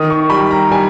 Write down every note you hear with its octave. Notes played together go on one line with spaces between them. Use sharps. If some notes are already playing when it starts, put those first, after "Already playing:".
Already playing: D#3 D#6
C#6
G3 B5
A#5
G3 G#5